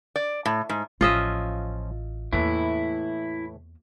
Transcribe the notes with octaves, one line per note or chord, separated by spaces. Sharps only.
D5
A2
G#2
A1 F3 C#4 F4 D#5 E5 G#5
E2 A2 E3 A#3 E4